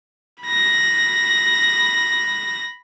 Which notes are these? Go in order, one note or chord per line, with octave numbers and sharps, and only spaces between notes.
B5 A#6